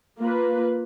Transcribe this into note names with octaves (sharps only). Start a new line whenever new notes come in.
A#3 F4 B4